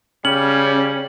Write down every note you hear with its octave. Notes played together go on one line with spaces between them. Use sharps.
C#3 G3 C#4 F#7